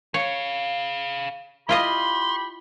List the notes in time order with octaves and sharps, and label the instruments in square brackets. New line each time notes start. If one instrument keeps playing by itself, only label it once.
[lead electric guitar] G#4 F5 [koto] C#5
[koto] E4 F4 D#5 [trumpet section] G4 B5 [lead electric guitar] C6